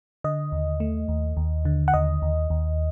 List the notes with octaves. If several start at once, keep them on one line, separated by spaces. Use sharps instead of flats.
D3 D#5
D#2
A3
D#2
D#2
D3
F#5
D#2 D#5
D#2
D#2